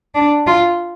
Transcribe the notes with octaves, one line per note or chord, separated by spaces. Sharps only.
D4
F4